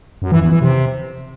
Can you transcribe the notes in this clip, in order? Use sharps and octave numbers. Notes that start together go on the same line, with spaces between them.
F#2
E3
E2
E3
C3